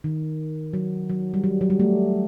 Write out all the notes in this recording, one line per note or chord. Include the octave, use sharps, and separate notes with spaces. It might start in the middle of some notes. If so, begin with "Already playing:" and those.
D#3
F#3
F#3
G3
F#3
F#3
G3
A3